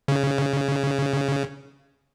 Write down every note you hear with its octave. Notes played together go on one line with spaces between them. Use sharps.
C#3